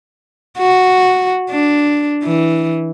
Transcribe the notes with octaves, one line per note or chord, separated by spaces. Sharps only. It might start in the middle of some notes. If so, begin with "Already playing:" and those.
F#4
D4
E3